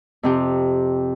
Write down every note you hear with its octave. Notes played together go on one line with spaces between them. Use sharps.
F2 C3 G4